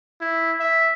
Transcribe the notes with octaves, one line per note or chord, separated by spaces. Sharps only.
E4
E5